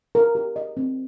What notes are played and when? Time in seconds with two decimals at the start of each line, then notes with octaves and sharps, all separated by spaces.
0.15 A#4
0.35 G4
0.56 D#5
0.77 C4